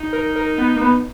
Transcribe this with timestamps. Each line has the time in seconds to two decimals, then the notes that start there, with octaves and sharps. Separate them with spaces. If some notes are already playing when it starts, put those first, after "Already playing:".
Already playing: D#4
0.13 A#4
0.36 A#4
0.58 B3
0.76 A#3
0.81 B3